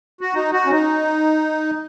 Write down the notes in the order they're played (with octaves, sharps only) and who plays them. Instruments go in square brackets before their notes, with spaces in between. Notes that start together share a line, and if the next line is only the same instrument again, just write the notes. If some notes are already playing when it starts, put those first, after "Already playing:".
[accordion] F#4
D#4
F#4
C#4
D#4